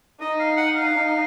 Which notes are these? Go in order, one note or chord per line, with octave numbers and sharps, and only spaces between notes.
D#4 D#5
F5
F#5
F5
D#4